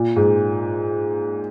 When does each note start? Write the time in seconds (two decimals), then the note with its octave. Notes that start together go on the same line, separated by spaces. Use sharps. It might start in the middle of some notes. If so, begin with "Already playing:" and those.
Already playing: A#2
0.16 G#2